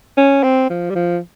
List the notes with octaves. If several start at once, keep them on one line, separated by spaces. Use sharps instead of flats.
C#4
C4
F3
G3
F3